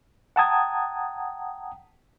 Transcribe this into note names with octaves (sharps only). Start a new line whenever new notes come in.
F#5 G5 A5 A#5 D#6 G#6